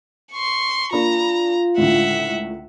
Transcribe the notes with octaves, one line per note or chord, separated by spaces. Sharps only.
C6 C#6
A#3 D4 F4 A#5 B5
C#2 A2 D3 E5 F#5